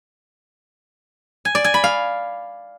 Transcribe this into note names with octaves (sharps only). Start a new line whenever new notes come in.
G#5
D5
G#5
B5
F5